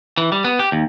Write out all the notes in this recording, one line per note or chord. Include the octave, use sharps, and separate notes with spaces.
E3
G3
B3
G4
D#2